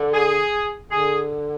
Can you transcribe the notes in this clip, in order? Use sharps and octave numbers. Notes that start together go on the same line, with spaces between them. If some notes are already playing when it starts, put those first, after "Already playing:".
Already playing: D3
G#4
D3 G#4